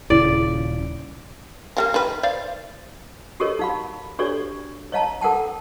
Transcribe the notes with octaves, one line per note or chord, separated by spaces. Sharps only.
D#1 C#3 E4 D5
F3 G3 A#3
D#3 B4
C5 D5 F5
F#4 G4 A4 A#4 C#5 D#5
D#4 F5 B5
D4 F#4 G4 A4 C#5 D5
C#5 D#5 F5 A5 A#5
A4 A#4 F#5 G5 A5